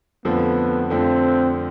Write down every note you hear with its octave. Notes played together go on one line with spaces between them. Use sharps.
F2 D3 F3 A3 B3
F2 D3 F3 A3 C4